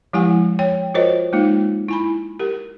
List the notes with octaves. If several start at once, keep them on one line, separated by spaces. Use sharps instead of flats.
F3 G#3 E4 G4 F#5 G#5
C#5 G5
F4 F#4 A#4 C5 C#5 D#5
G#3 A#3 D#4 F4
E4 G#5 B5
G4 A#4